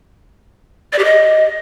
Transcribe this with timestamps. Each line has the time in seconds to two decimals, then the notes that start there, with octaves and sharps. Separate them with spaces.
0.93 D5
0.99 G4
1.04 D#5